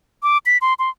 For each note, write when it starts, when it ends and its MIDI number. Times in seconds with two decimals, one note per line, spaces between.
0.23 0.38 86
0.46 0.58 95
0.61 0.74 84
0.79 0.90 84